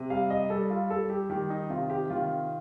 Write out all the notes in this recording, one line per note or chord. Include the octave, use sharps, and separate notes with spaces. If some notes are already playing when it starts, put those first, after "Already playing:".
Already playing: C3
G3 F5
D#5
G3 A4
F4
G3 A4
G4
D#3 G4
D#4
C3 F4
G4
D#3 F4